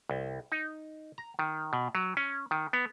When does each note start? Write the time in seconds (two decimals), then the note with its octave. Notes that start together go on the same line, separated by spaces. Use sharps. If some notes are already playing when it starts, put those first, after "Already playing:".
0.09 C2
0.52 D#4
1.18 A#5
1.39 D#3
1.73 B2
1.95 F#3
2.17 C#4
2.51 D#3
2.73 B3